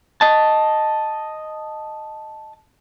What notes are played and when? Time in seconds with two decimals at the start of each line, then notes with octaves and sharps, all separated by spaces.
0.21 D#5 A5